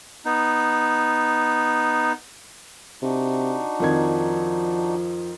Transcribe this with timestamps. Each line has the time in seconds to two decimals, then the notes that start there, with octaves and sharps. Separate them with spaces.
0.25 B3 D#4
3.02 C3 D4 D#4 F#4
3.80 F2 D#3 F3 G#6